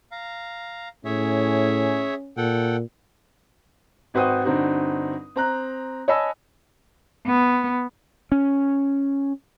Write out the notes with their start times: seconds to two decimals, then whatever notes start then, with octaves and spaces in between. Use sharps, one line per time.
0.12 F5 A#5
1.05 A2 C#4 G#4 C#5 E5
2.37 A#2 A4 F#5 G5
4.14 G#1 F#4 B4 C5 G5 D#6
4.45 G2 D3 C4 D#4 F#4
5.36 C4 A#5 F#6
6.08 C#5 D#5 G#5 A5 B5 E6
7.27 B3
8.32 C#4